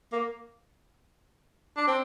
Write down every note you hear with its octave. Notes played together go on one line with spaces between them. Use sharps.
A#3
D4
C4